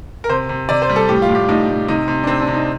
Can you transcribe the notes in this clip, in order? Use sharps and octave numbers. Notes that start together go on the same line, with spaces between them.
A#4
C3 C5
C3
C3 D5
C5
G3
A4
A2 G4
F4
A2
G4
A2 D#4
A2
C3 D#4
C3
D4
C3 C4
D4
C3
D#4